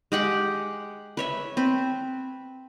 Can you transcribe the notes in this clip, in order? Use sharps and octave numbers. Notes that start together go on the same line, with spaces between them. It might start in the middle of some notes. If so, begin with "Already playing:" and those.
G#3 G4 F#5 G5
B4 C#5 E5
C4 B4